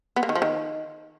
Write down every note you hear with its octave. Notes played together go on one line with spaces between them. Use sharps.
B3
A#3
D#3
F3
D#3